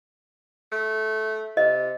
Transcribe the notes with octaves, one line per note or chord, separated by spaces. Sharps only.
A3
C3 D#5